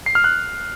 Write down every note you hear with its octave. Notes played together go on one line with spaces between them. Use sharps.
C7
F6
F#6